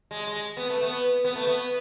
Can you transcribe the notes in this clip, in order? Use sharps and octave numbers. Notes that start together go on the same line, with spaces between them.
G#3
G#3
B3
A3
B3
B3
A3
B3